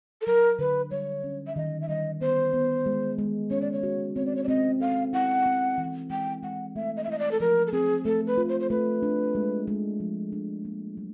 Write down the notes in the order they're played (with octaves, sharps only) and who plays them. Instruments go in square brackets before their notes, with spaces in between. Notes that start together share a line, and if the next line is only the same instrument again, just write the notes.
[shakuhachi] A4
[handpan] F#3 [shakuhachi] A#4
[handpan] D3 [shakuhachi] B4
[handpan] G3 [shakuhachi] C#5
[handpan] C#4
[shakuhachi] E5
[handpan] D#3 [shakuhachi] D#5
[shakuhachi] E5
[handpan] G3 [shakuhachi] D#5
[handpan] B3 [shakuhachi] C5
[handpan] B3
G#3
G#3
[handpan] C#4 [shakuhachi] C#5
[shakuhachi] D5
C#5
[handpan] F#4
[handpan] C4 [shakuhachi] C#5
[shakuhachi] D5
C#5
D5
[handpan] C4 [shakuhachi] D#5
[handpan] A4 [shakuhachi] F5
[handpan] E4 [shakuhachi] F#5
[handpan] C4
E3
[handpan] G#3 [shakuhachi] G5
[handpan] G#3 [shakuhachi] F#5
[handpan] A3 [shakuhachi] E5
[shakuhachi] D#5
E5
[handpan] E4 [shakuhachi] D#5
[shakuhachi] D5
A4
[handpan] F3 [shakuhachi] A#4
[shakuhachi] A4
[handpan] C4 [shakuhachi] G#4
[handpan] A3 [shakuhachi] A4
[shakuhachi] B4
[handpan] F4
[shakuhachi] C5
C5
[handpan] A3 [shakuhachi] B4
[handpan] D4
G#3
G#3
F3
D4
A#3
F#3